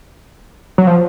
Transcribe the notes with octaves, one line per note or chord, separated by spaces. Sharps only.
F#3
F3